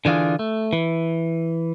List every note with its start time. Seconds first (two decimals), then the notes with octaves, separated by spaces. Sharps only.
0.05 D3 E3 D4 F4 G#4
0.39 A3
0.73 E3